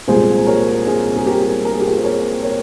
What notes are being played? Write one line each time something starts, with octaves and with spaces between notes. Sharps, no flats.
C2 A#2 F3 G#3 G#4 C5
A#4 C#5
G#4 C5
G#4
G4 A#4
A#4
G#4
G4
F4 G#4
C5
A#4 C#5
A#4 C#5